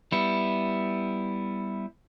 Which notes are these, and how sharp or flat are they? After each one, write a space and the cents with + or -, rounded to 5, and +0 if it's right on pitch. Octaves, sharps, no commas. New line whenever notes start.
G3 +0 B3 +0 E4 +0